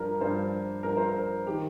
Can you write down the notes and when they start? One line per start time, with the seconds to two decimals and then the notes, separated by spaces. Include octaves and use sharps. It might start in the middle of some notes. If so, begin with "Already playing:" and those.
Already playing: G2 F3 A#4
0.21 G2 F3 C5
0.83 G2 F3 A#4
0.97 C5
1.09 A#4
1.47 D#3 G4